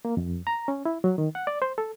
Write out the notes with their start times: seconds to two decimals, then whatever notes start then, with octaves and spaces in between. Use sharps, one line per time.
0.05 A#3
0.17 F2
0.47 A#5
0.68 C#4
0.85 E4
1.04 F#3
1.18 D#3
1.35 F#5
1.47 D5
1.62 C5
1.78 A4